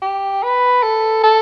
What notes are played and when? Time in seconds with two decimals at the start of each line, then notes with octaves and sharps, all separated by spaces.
0.02 G4
0.43 B4
0.83 A4
1.24 A4